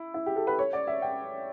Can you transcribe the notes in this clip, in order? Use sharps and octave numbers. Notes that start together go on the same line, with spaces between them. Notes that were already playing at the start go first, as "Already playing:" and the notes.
Already playing: E4
E4
G4
A4
B4
C#5
D5
E5
G5